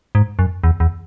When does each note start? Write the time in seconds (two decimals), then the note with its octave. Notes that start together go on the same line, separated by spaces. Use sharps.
0.15 G#2
0.39 F#2
0.64 E2
0.80 E2